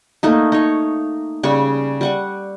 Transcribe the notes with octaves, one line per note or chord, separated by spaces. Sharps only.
A3 A#3 D#4
D#4 C#5
C#3 G3 C#6
G3 F#5 C#6